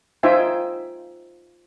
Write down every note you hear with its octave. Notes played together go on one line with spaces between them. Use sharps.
D#4 F4 C5 E5 G5 G#5